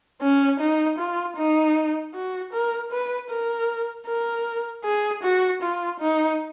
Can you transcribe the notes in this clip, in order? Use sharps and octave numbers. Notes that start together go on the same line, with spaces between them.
C#4
D#4
F4
D#4
F#4
A#4
B4
A#4
A#4
G#4
F#4
F4
D#4